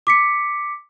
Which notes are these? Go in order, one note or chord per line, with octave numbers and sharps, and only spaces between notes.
D6 B6 C#7